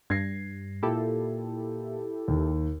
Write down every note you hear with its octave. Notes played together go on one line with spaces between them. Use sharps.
G2 G#6 A#6 C7
A#2 E4 G4 A4
D#2